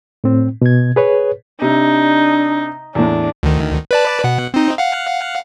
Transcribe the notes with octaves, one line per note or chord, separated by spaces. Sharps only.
A2 C4
B2 G#6
G#4 B4 C#5
C3 D4 D#4
E2 A2 D4
D2 D#3
B4 D5 A5
B2 F#5
C4 D#4
F5 F#5